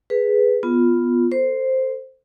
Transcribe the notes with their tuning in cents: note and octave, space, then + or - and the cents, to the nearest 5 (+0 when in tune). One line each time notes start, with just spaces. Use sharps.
G#4 +0 B4 +0
B3 +0 F4 +0
A4 +25 C5 +0